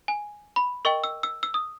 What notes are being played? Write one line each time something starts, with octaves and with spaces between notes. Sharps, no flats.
G#5
B5
A#4 D#5 G5 C#6
E6
E6
E6
D#6